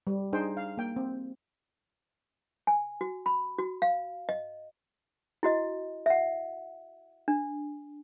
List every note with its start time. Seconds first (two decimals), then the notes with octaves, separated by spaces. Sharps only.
0.07 G3
0.33 D4 D#4 G#4 C5 G5
0.57 F5
0.78 A#3 G5
0.96 C4
2.67 G#5
3.01 F#4
3.26 B5
3.58 F#4
3.82 F5
4.29 D#5
5.43 E4 F#4 D#5
6.06 E5 F#5
7.28 D4